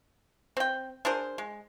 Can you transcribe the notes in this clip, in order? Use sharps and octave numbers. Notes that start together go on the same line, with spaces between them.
C4 G5
D4 G#4 A#4 C5
G#3